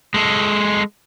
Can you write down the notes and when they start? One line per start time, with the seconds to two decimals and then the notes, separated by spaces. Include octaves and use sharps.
0.14 G#3 A4